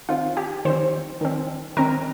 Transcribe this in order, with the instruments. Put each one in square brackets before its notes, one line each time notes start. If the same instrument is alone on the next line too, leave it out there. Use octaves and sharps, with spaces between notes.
[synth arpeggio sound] D#3 C4 F4
G4
D#3 C4 C5
D#3 C4
D#3 C4 A#4